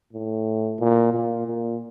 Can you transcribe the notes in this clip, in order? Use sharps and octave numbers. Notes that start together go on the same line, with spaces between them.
A2
A#2
A#2
A#2